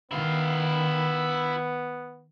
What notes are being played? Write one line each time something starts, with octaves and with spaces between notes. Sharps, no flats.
D#3 B3 E4 F5